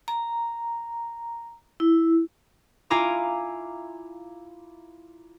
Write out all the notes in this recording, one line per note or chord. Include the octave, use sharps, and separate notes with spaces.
A#5
E4
E4 F4 G#5 A#5 D6